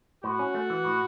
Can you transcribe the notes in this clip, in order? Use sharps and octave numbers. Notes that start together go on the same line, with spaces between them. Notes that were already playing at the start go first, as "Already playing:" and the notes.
A2 F#4
C#4
A3
E3
A2